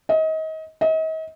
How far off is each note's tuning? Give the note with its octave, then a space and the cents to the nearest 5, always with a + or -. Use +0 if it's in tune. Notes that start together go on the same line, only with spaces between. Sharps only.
D#5 +30
D#5 +40